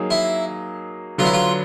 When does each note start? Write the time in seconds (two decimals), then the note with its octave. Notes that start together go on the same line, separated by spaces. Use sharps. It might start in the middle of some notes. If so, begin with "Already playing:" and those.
Already playing: F#3 A#3 D#4 G#4
0.11 E4
1.18 D3 F#3 B3 F4
1.25 E4
1.33 F4